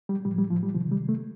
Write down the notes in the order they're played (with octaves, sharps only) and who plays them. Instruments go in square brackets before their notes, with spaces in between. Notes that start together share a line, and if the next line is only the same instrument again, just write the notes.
[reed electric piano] G3
A2 F3 G3
G3
F3
G3
C3 D#3 F3
G3
A3